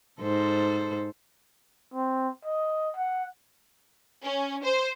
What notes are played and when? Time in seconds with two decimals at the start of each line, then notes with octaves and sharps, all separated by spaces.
0.21 G#2 A4 C5
1.94 C4
2.45 D#5
2.97 F#5
4.22 C#4
4.63 C5